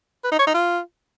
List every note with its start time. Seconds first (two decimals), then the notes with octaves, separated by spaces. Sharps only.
0.24 B4
0.32 D#4
0.39 C#5
0.47 D#4
0.54 F4